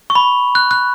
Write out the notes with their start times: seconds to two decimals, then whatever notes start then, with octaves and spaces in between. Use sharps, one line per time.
0.10 C#6
0.15 B5
0.55 F#6
0.71 F#6